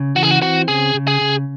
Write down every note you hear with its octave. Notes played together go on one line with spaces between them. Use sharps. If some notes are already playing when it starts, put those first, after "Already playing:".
Already playing: C#3
E3 F#4
G#4
F#4
C4 F#4
C#3 G#4
C#3
G#4
C#3